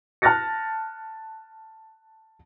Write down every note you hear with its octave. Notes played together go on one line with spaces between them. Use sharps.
A5 F6 F#6 A6 A#6 C#7